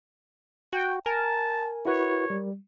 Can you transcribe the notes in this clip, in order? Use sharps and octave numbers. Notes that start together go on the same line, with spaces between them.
F#4 G5
A#4 G#5 A5
E4 F#4 B4 C#5
G3